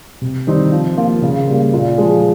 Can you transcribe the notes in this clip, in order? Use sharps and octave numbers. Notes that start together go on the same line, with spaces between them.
C3
D#3 G3 C4 D#4
F3
A#3 F4
C#3
G3 A#3
A#2
F3 G#3